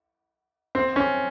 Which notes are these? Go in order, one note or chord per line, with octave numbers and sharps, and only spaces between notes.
C4
C#4